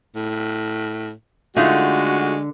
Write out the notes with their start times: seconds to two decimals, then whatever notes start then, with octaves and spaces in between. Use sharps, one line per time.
0.16 A2
1.56 D3 G#3 A3 D#4 F4 F#4